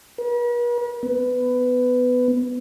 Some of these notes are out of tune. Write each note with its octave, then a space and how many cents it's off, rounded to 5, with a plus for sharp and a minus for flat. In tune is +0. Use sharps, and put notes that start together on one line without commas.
B4 -45
B3 +15